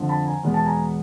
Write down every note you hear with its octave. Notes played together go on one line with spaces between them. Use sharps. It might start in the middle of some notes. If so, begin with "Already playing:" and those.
Already playing: F2 D3 F3
A5 B5
G#5 A#5
E2 B2 G#3 B3
A5
G#5 A#5